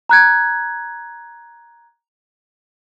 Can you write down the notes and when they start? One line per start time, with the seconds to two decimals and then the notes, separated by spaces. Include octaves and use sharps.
0.09 A#5 F#6 G#6